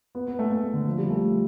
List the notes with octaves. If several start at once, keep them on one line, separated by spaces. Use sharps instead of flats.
B3
B3
A3
A3
D3
F3
G3
A3